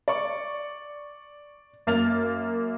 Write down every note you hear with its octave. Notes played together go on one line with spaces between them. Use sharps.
D5 C#6
F#2 A#3 F6 A6 F7